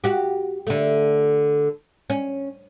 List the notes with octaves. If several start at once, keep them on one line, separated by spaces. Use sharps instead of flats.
F#4 G4
D3 A3
C#4